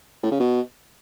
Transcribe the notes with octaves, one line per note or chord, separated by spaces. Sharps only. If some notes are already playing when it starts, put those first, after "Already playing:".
A2
C#3
B2